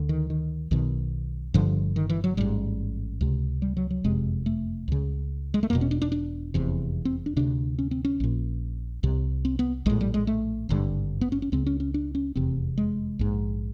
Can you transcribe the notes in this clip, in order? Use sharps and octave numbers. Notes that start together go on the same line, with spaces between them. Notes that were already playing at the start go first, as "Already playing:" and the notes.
Already playing: D2 D3
D#3
D#3
B1 B2 D#3
G1 G2 D3 F3
D#3
E3
F#3
A1 G#2 G3
C#2 C3
G3
F#3
F#3
F#1 F2 C3 G#3
A3
C#2 C#3
G#3
A3
E1 E2 B2 A#3
C#4
D4
D4
D4
F1 E2 C3
C4
D4
D2 C3 D4
C#4
C4
C#4
A#1 A#2
C2 C3
C4
B3
A#1 A2 G#3
G3
G#3
A3
G#1 G2 D3
B3
C#4
C#4
C#2 C#3 C4
C#4
C#4
D4
C#4
F1 E2 C3 C4
G#3
A#1 G#2